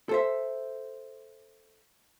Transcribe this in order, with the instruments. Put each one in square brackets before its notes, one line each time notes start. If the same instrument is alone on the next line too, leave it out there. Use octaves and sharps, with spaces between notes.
[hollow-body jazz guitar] A4 C5 E5